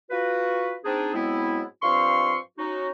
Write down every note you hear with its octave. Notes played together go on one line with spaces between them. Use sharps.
F4 F#4 B4
C4 D4 D#4 G#4
G#2 F#3 G#3 B3 C4 E4
G2 F3 C4 F5 C6 C#6
C#4 D#4 F#4